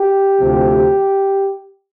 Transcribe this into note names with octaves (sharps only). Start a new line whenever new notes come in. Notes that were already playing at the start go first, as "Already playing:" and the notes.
Already playing: G4
D2 C3 F3